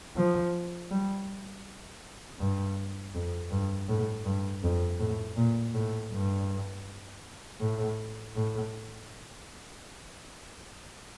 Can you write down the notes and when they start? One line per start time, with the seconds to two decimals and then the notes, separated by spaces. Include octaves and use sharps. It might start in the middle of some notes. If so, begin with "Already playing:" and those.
0.16 F3
0.91 G3
2.39 G2
3.14 F2
3.51 G2
3.89 A2
4.25 G2
4.63 F2
5.00 A2
5.37 A#2
5.74 A2
6.12 G2
7.60 A2
8.35 A2